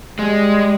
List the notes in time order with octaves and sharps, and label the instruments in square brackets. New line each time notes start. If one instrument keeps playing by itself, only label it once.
[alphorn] G3 [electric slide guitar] G#3